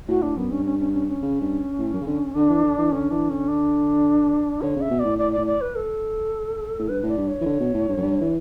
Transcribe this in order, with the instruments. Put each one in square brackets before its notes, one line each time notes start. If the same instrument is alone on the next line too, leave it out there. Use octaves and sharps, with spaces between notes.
[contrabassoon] A2 [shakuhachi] F#4
[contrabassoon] A2 [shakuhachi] D4
[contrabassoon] F#2 [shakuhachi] B3
[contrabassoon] G2 [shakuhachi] C#4
[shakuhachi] C#4
C#4
C#4
C#4
[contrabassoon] C#3
G2
A2
F#2
C#3
D3
[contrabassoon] D3 [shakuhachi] D4
[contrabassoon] E3
D3
E3
[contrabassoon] D3 [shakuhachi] C#4
[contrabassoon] E3 [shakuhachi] D4
[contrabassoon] D3 [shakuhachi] C#4
[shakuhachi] D4
[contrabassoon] D3 [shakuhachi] C#5
[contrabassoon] C#3
[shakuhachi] E5
[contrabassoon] B2
[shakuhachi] D5
[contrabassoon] A2
[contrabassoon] A2 [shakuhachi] D5
[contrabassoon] A2 [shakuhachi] D5
[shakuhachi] D5
B4
A4
[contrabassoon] A2
[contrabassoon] G2 [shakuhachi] B4
[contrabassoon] A2
[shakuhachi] D5
[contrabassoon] G2
[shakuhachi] C#5
[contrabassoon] E3
D3
B2
A2
G2
F#2
G2
E3